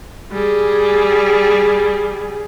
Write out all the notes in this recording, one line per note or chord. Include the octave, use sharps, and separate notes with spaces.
G3 G#4